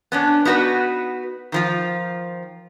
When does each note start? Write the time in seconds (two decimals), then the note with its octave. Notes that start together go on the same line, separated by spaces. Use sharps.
0.12 B3 C#4 D4
0.45 B3 D#4 F#4 A#4 B4
1.52 D#3 F3 F4